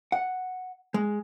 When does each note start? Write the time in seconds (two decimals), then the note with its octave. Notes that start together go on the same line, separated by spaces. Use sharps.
0.12 F#5
0.94 G#3